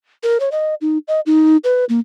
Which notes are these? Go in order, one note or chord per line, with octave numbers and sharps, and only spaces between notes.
A#4
C#5
D#5
D#4
D#5
D#4
B4
A#3